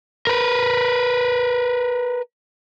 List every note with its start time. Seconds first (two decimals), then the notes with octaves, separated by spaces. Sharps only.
0.27 A#4 B4